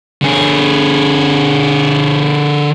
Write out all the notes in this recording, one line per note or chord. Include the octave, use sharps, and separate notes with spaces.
D3 G#4